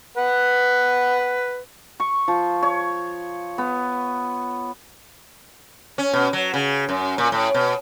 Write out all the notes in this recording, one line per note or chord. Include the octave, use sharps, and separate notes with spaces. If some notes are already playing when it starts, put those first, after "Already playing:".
B4 F#5
C#6
F3
C#5
B3
C#4
B2
F#3
C#3
F#2
A#2
A2
B2